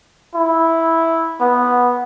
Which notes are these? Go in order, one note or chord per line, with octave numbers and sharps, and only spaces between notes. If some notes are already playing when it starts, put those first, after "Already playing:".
E4
B3